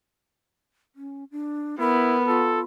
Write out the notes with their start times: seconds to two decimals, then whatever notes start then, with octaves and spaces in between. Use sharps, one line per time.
0.96 C#4
1.31 D4
1.79 B3 E4 A#4
2.27 F4 A4